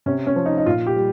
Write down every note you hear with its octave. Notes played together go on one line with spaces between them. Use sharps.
C3 C#4
C#4
F3
D#4
D#4
A#2 F4
G4
G3